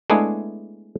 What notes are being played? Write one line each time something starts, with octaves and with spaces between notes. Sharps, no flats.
G#3 A3 B3 D4 E4 G#4